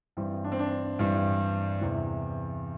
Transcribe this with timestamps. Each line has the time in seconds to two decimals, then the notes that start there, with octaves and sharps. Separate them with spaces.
0.17 G2 E3 G3 C4
0.44 D4
0.52 C4
0.59 D4
0.99 G2 E3 G3
1.81 E2 C3 E3